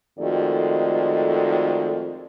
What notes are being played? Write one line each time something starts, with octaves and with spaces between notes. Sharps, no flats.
F2 D#3 G#3 A3 F#4 D5